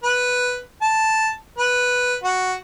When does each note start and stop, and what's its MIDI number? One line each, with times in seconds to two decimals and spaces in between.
0.04 0.60 71
0.82 1.31 81
1.58 2.16 71
2.23 2.55 66